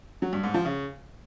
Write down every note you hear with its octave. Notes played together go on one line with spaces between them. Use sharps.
F#3
G2
G#2
F3
C#3